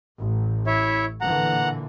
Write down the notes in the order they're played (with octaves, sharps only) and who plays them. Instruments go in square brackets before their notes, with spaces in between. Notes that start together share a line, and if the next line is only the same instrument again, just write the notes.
[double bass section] A1
[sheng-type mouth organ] E4 C#5 E5
[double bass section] A#2 D3 E3 [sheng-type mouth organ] F#5 A#5